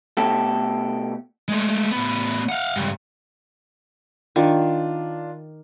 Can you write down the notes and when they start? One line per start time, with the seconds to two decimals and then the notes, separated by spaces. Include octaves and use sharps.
0.17 B2 A3 G4 A4
1.48 G#3 A3
1.91 A2 B3
2.49 F5 F#5
2.76 C#2 G2
4.36 D#3 D4 F4